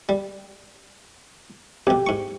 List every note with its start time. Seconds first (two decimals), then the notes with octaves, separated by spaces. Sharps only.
0.09 G3
1.87 F2 B2 G4
2.07 G#2 C#6